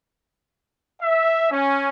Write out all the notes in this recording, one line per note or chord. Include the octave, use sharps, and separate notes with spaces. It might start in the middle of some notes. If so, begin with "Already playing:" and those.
E5
C#4